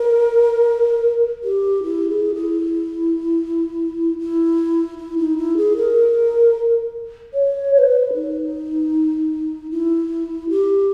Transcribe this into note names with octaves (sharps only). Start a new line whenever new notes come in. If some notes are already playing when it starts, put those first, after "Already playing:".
Already playing: A#4
G4
E4
G#4
E4
E4
E4
D#4
E4
G#4
A#4
C#5
C#5
B4
D#4
E4
G4